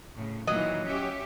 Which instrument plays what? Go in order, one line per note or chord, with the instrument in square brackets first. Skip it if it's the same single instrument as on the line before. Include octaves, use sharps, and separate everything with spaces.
[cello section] A2 C#3
[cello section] A#2 D#3 E3 [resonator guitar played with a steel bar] F#3 D#5
[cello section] C#4 G4 E5